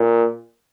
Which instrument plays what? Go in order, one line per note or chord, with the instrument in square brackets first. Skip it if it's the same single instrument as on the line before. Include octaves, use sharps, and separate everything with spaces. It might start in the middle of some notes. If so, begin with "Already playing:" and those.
Already playing: [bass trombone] A#2